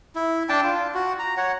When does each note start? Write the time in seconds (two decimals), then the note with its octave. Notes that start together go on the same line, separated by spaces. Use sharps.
0.15 E4
0.49 D4 G5 A5
0.64 F4
0.94 F#4
1.19 A#5
1.37 C#5 F#5